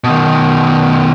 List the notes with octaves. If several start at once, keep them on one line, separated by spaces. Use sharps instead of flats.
B2 D#3